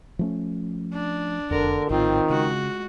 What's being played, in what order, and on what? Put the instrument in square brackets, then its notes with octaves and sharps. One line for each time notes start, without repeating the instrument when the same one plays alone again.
[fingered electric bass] F3 A3 C#4
[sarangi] D4
[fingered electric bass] E1 F2 [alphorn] D3 [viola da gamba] A#4
[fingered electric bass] A#1 A2 [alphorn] D#3 [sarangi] C4 [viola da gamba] F4
[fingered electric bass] C#3 [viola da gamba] G#3 [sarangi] F#4